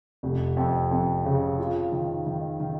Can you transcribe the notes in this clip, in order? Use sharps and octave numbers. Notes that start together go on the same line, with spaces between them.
F1
F2
F2
C#3
F4
D#3
D#3
D#3